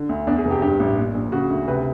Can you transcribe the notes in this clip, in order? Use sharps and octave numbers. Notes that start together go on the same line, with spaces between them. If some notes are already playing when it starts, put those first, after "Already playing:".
Already playing: D3
D2
E2 D4
G#4
F1
G4
G2 G4
A1
A#2
A#1
C#3 F#4
D2
C3 B4